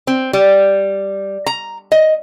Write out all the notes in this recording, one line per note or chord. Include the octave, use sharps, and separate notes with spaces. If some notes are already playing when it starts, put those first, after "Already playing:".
C4
G3
A#5
D#5